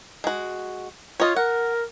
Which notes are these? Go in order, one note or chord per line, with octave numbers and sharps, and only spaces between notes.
G#3 F#4
F4 C#5 D#5
A#4 F#5